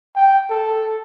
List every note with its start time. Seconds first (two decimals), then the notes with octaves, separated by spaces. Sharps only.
0.16 G5
0.50 A4